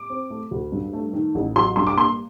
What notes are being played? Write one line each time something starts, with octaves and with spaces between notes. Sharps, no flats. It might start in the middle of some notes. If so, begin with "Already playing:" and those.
Already playing: D6
C4
A3
D2
G2
A3
D#3
A1
F#3 C6
G2 C6
D6
A#3 C6